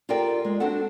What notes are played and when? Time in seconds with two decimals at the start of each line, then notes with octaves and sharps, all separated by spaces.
0.09 F4 G4 A4 A#4 D5 G5
0.45 G#3
0.60 C4 D4 F#4 A4 F#5